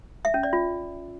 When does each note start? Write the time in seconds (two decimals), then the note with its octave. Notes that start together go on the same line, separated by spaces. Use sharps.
0.25 E5
0.34 C#4
0.43 D5
0.53 F4